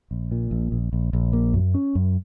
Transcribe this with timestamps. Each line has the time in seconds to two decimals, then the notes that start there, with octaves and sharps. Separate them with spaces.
0.11 A#1
0.32 A#2
0.51 A#1
0.72 A#1
0.93 A#1
1.13 A#1
1.33 A#3
1.54 F#2
1.74 C#4
1.95 F#2